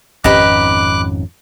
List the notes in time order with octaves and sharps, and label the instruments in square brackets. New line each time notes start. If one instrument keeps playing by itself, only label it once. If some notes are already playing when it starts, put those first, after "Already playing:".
[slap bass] G#1 F2 C#4 [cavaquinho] D#4 G4 B4 [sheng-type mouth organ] D6 F#6